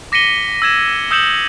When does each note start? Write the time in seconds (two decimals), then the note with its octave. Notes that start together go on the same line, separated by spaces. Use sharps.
0.12 D6 A#6 B6 C#7 D#7 G7
0.62 E6 G#6 E7
1.11 D#6 E6 G6 C#7 E7 F#7